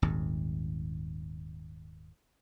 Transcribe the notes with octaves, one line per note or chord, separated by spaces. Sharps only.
D#1 G#1 D#2